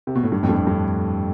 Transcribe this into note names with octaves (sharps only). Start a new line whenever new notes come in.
C3
B2
A2
G2
F2 A2
G2
F2
G2